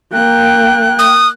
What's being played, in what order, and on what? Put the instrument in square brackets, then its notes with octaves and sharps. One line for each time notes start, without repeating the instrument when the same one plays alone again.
[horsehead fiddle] A#3 G5 [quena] F#6
[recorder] D#6